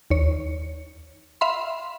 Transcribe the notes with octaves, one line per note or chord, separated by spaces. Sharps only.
D#2 C#5
E5 F5 B5 C6